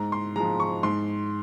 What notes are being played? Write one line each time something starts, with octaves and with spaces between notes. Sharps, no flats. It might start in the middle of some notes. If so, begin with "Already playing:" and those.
Already playing: G#2 A#5
C6
F3 G#3 A#5
C#6
G#2 C6